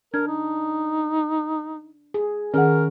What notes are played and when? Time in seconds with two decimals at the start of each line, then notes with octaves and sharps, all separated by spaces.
0.14 D4 A#4 G#6
0.27 D#4
2.14 G#4
2.54 D#3 C#4 G#4 A#4 F#5